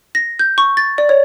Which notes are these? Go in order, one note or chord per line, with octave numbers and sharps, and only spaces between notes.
A#6
G6
C#6
A6
D5
C#5